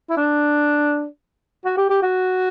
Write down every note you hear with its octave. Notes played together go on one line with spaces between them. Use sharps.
E4
D4
F#4
G4
G4
F#4